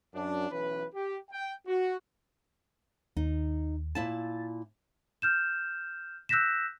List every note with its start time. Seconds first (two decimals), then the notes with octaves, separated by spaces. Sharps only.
0.14 F#2 D4
0.51 B1 E3 C#4 B4
0.95 G4
1.31 G5
1.67 F#4
3.17 D#2 D#4
3.95 A#2 E4 A5 A6
5.22 F6 G6 E7
6.29 E6 F#6 G6 A#6 B6 E7